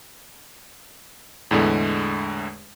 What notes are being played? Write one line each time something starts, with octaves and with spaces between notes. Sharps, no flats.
E2 A2 D3 G#3 A3